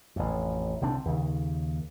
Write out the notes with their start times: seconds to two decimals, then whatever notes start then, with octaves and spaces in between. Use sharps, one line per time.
0.16 A1 F2
0.81 C2 D3 C4 D4
1.05 D#2 C#3